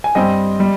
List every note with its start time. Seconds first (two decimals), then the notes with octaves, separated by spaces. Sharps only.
0.04 G#5
0.15 G2 G3 C4 D#5 G5
0.60 G3